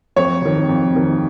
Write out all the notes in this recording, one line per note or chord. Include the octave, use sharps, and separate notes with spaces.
F2 C#5
C3 D#3
F2
C3 D#3